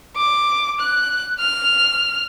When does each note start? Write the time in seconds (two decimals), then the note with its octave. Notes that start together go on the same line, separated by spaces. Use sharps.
0.16 D6
0.80 F#6
1.40 F6